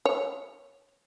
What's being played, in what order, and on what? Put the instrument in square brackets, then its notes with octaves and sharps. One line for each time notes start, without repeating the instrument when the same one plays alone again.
[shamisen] C#5